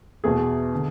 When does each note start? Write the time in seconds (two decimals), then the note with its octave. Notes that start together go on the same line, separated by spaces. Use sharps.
0.24 E2 B2 G#4
0.75 D3